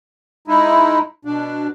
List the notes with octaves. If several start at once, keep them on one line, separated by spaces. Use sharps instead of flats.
G#3 D#4 E4
B2 D4